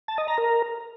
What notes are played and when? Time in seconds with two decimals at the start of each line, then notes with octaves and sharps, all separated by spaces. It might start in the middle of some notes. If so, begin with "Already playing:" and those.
0.08 A5
0.18 D#5
0.28 A#5
0.38 A#4